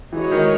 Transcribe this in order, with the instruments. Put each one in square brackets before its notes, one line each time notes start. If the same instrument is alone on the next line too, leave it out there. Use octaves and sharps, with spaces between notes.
[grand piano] E3 [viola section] G#3 D#4 F#4 C#5
[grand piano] D#3